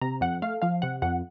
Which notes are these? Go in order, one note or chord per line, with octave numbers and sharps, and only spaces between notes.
C3 A#5
F2 F#5
A3 F5
F3 F5
C3 F#5
F2 F#5